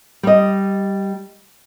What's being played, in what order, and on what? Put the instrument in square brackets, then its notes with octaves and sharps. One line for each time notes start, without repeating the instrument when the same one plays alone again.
[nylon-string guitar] G3 D#5